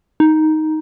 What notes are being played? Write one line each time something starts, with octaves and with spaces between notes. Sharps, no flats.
D#4